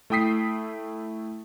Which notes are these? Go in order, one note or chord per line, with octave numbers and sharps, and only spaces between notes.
A3 E4 G5 D#6 B6 C7